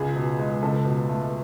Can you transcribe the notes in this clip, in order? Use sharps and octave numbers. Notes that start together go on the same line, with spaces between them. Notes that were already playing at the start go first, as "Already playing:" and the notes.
Already playing: C#2 G#4
B2
G#3
C#2 A4
B2
A3